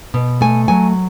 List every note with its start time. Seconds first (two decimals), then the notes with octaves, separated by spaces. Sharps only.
0.14 B2
0.41 A3 G#5
0.68 F#3 G#5